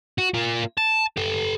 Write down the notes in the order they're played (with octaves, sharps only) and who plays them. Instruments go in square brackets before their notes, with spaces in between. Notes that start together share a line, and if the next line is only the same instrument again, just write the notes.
[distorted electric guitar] F#4
A#3 F4
A5
G4 A4